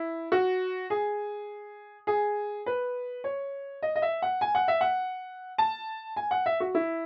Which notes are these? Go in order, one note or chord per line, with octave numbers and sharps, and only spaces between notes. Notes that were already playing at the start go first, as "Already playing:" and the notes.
Already playing: E4
F#4
G#4
G#4
B4
C#5
D#5
D#5
E5
F#5
G#5
F#5
E5
F#5
A5
G#5
F#5
E5
F#4
E4